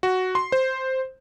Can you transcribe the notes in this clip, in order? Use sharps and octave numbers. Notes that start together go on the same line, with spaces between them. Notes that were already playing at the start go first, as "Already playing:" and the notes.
F#4
C6
C5